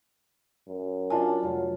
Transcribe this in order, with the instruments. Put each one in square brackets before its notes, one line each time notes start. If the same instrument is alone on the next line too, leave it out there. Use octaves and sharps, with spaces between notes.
[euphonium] F#2
[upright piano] D4 F4 F#4 [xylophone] G#5 A5
[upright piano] F1 F4 [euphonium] F#3